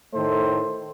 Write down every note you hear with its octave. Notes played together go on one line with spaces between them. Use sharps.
A2 D#3 A3 D#4 A4 C5